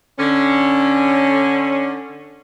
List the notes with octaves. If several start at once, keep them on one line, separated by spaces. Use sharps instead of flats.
D3 C#4